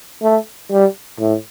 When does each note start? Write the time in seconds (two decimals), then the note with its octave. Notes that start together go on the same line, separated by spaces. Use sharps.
0.22 A3
0.71 G3
1.19 A2